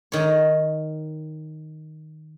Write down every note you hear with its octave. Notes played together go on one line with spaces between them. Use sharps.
D#3 C#5